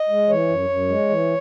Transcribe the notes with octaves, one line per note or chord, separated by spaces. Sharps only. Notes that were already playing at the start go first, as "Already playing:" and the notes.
Already playing: D#5
G#3
E3 C#5
F#2
F#2
G#3
E3